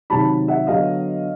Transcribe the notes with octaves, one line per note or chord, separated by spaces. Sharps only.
C3 D#3 F#3 A5 B5
E5 F#5
D3 F#3 B3 D#5 F5